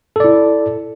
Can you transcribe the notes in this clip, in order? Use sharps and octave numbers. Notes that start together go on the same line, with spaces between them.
E4 A4 D5